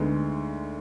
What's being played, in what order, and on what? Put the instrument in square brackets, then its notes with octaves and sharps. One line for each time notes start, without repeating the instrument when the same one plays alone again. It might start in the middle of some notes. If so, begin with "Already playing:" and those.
Already playing: [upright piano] D2 D3 G#3 B3 D#4